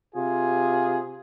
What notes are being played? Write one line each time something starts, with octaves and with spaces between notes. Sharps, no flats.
C3 F4 G#4